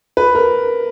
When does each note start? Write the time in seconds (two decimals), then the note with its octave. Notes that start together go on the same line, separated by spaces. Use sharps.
0.17 B4
0.35 A#4